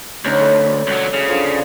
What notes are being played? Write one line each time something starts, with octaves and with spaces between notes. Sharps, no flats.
D2 F#3 C#4 D#4
A4 D5 B5
C#2 F#3
C#3
D3 F3